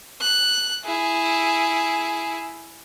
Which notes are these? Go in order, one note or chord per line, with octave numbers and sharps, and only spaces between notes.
F#6
E4 G#4